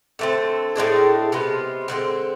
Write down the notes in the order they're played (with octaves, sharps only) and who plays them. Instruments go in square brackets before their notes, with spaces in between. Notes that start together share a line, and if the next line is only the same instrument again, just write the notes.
[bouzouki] D3 A3 C4
A2 G#3 D4 G#4
C3 G#3 B3 F4
D3 F3 G#3 C4